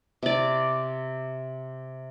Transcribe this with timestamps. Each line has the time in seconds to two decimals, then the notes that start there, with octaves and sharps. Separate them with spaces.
0.23 C3 D5